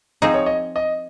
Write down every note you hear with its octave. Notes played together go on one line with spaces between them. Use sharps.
F3 C4 D#4 G#4 D#5
C#5
D#5
D#5